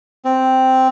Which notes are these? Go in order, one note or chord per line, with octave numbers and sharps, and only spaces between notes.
C4